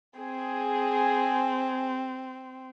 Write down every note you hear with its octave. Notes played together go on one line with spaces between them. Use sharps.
C4 G#4